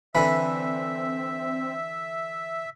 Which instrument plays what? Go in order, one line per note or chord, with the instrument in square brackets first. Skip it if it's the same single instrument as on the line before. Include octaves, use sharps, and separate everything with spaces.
[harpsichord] D3 E3 [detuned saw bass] C4 [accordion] E5 [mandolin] B5